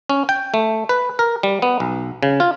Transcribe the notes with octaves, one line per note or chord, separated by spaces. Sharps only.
C#4
G5
A3
B4
A#4
G3
B3
B1
C#3
F4